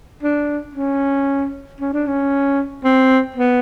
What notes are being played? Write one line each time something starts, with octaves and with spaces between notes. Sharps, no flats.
D4
C#4
C#4
D4
C#4
C4
B3